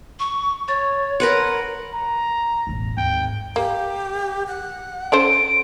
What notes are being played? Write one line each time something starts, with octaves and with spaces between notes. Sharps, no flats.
C#6
C#5 C#6 A6
A#4 B4 F#5 C6 F#6 A#6
A#5
E1 A1
G#1 D#2 G5
A#3 G4
F#5
C#4 A4 C5 D7